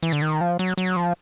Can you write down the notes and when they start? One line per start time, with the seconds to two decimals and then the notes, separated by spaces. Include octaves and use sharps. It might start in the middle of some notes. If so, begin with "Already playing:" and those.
0.03 E3
0.12 D3
0.22 D#3
0.41 F3
0.59 F#3
0.78 F#3
0.96 F3